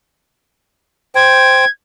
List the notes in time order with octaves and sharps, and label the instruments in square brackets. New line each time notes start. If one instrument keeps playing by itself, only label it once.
[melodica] C5 G5 [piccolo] G#6